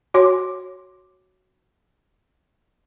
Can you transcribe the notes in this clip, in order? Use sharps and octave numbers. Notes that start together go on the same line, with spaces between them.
F#4 C#5 C6 D6